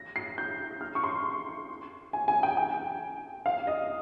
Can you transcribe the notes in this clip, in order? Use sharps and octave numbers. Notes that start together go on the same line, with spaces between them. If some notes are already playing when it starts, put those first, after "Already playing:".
Already playing: A#6
C7
G6
F6
C#6
C6
G#5
G#5
G5
G5
F5
D#5